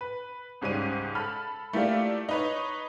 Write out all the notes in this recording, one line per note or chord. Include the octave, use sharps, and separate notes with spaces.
B4
C#2 G#2 G3 C#4 D#7
A4 B5 F6
A3 A#3 E4 F4 G4 D5
D#4 B4 C#5